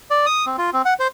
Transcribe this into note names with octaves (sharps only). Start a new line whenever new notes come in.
D5
D#6
C4
F4
C4
F#5
C5